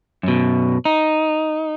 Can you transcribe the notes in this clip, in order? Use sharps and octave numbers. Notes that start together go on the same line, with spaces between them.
F#2 B2
D#4